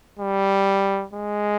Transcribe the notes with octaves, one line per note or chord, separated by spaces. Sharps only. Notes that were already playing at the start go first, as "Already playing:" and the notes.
G3
G#3